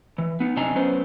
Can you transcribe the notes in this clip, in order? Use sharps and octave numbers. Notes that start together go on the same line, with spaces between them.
E3
B3 D#4
F#2 C3 D4 D#5 G#5 A#5
F#3 B3 C#4 B4 C5